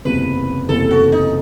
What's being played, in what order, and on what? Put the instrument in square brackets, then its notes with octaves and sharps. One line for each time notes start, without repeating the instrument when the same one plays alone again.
[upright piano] F#1 E2 C3 [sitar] B4
[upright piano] F#1 E2 C3 [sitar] A4
[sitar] F#4
D#4